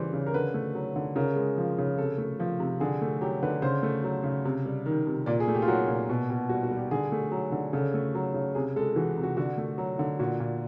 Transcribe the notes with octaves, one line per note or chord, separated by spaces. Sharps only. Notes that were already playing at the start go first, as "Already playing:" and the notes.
Already playing: C#3 E3 G3 C5 D5
C#3
A#4
D3 B4
A3
F#3
D3
C#3 A#4
G#3
F3
C#3
C3 A4
A3
F3
C3
D3 G#4
A3
F#3 G4
D3 B4
C#3 C5
A3
F#3
C#3
C3
G3
D#3
C3
A#2 D5
G#4
A3
G4
F4
F#3 F#4
A#2
B2
B2
G3 F#4
F#4
G3
G4
D3 G#4
A3
F#3
D3
C#3 A4
A3
F#3
C#3
C3 G#4
G#3 A4
E3 F#4
C3
F#4
D3 F#4
A3
F#3
D3
A#2 F#4
A#2